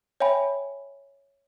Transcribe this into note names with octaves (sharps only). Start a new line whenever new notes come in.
C#5 E5 G5 G#5 B5